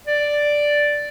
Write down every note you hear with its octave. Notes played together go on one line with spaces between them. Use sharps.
D5